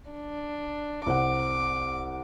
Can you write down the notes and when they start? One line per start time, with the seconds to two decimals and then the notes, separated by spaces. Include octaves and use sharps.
0.11 D4
1.06 C2 C5 F#5 D6